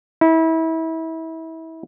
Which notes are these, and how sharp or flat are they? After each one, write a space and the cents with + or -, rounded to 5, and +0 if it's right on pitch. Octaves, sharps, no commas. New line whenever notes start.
E4 -30